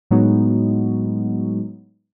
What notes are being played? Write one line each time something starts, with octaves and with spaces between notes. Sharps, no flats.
A2 F#3 G#3 B3 D#4 F#4